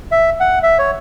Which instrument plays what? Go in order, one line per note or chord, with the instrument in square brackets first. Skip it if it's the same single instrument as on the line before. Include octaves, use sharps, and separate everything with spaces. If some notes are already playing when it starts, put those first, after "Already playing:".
[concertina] E5
F#5
E5
C#5